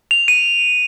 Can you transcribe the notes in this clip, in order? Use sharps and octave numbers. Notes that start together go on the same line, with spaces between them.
F7
D#7